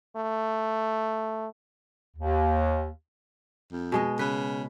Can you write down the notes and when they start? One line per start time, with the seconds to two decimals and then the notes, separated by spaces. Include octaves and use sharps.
0.16 A3
2.16 D#2
3.72 F2
3.92 B2 G#3 D#5
4.19 C#3 B4